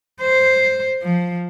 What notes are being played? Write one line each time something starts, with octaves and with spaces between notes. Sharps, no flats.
C5
F3